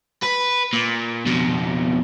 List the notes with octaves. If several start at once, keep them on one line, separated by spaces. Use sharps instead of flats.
B4
A#2
F2 B2